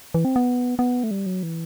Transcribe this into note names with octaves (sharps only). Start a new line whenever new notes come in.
E3
C4
B3
B3
A3
G3
F#3
E3